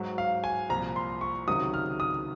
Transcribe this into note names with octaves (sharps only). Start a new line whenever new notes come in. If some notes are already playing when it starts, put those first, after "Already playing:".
Already playing: G#2 F#3
F5
G#5
C2 A#2 F3 A#5
C6
C#6
C#2 C3 D#3 F#3 D#6
F6
D#6